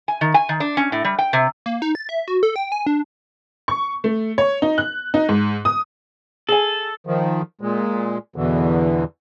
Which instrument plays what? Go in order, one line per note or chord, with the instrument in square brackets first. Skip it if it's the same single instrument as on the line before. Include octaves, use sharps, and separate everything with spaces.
[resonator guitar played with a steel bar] G#5
D#3
G#5
D#3
D4
C#4
A2
G3
G5
C3
[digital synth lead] A#3
D#4
A6
E5
F#4
A4
G5
G#5
D4
[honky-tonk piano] C#6
A3
C#5
D#4
F#6
D#4
G#2
D#6
[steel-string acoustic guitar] G#4 G#5 [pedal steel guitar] A4
[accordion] D#3 F3
A#2 G#3
E2 B2 D3 E3